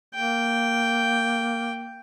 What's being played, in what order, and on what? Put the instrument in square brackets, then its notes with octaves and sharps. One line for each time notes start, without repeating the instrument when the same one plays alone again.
[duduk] A#3 [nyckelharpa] G5